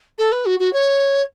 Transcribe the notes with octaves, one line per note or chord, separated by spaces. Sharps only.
A4
B4
F#4
F#4
C#5